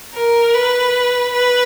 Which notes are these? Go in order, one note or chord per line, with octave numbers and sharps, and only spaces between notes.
A#4
B4
B4